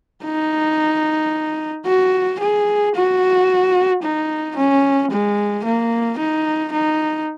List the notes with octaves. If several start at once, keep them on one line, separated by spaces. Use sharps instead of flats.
D#4
F#4
G#4
F#4
D#4
C#4
G#3
A#3
D#4
D#4